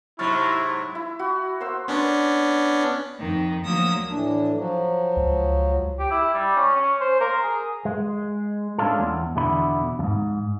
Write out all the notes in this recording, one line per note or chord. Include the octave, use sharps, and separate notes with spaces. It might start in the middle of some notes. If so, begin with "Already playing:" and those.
G#2 C3 F#3 E4 C#6 F6 A6
E4
F#4
A#4 C5 C6 E6
B3 C#4 D4
F2 D#3
D2 F3 F#3 A#3 D#6 E6
A2 E3 D4
F3 F#3
C#2
G4
E4
G3
C#4
C#4
C5
A#4
G#4
G#3
G#3 A3 C#4 D4 F4 A4
E2
E2 B2 D3 E4 B5
E2 G#2